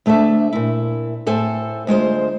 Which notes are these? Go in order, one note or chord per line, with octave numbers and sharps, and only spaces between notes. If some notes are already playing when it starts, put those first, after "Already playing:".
D2 A3 D4 A4 E5
A#2 E4
A2 A4 C5 G#5
D2 G#3 F4 C5